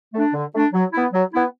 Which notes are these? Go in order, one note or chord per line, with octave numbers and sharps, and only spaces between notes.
A3 D4
D3
A3 D4
F#3
B3 E4
F#3
B3 E4